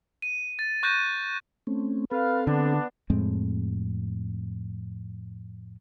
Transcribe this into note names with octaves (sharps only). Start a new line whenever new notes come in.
D#7
A6
C#6 F#6 G6 A6 A#6 D#7
A3 C4 C#4
C4 A4 B4 F5
D3 B3 D4
F2 A2 G#3 C4